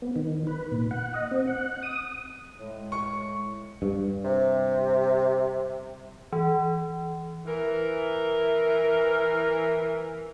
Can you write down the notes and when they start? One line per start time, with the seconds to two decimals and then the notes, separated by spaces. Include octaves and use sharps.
0.02 B3
0.16 D#3
0.47 B4
0.72 A#2
0.91 F#5
1.14 D#5
1.31 C4
1.47 F#5
1.83 D#6
2.59 A2 G#3
2.92 C#6
3.82 G2
4.25 C3
6.33 E3
7.46 E3 A#4